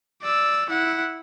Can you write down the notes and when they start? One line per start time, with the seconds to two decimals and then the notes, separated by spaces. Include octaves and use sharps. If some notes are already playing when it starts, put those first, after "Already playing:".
0.22 D5 E6
0.70 E4 F#5